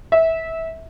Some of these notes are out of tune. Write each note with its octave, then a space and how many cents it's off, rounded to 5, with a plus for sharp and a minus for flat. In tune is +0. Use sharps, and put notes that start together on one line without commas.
E5 -20